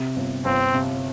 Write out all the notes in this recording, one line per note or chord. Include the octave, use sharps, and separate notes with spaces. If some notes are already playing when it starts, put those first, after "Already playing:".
Already playing: C3
G1
G1 C4
C3